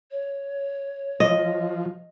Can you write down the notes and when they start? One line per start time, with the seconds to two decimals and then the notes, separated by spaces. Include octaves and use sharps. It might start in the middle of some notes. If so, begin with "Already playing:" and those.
0.11 C#5
1.20 F3 D#5